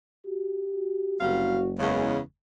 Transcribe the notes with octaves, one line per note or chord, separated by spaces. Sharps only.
F#4 G4
F#1 C3 G3 F#4 F5
E2 C#3 G#3